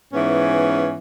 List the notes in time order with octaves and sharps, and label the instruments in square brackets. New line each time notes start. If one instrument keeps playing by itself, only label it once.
[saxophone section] G#2 E3 B3 C#4